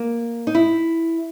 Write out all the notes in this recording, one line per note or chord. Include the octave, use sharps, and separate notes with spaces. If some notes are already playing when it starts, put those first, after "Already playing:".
Already playing: A#3
D#4
E4